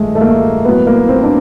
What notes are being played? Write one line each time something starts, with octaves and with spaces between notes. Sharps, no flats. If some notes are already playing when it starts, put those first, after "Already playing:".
Already playing: G2 D#3 G#3 A3
A3
A#3
A2 F#3 B3
A#3
C4
D4